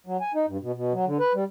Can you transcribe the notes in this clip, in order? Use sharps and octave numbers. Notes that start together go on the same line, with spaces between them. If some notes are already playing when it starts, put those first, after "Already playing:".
F#3
G#5
D#4
G2
B2
B2
F#3
D3
B4
G3